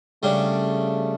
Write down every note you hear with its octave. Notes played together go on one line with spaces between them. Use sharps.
C#3 G3 A3 D4